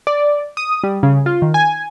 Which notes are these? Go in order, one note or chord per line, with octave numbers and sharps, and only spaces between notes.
D5
D#6
G3
C#3
F4
D#3
G#5